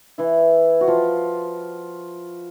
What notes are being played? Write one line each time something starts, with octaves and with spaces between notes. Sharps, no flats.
E3 E4
F#4
F3 F4